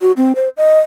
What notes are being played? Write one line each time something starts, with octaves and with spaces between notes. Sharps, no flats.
F#4
C4
C5
D#5